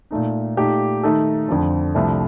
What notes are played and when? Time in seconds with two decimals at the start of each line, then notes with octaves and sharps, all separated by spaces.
0.11 A#2 A3 D#4
0.57 A#2 A3 D#4 G4
1.03 D#3 A3 D#4 A4
1.48 F2 D3 F3
1.95 C2 C3 F3 A3 D4